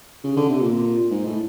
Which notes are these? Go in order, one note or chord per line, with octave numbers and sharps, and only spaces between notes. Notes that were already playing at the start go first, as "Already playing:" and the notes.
C#3
D3
C3
A#2
G#2
A2